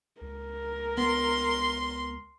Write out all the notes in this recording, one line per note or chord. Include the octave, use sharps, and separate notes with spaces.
C#2 A#4
B3 C6